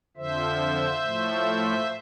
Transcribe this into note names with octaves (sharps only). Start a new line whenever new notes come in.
F2 D3 F3 C5 E5
A2 F3 A3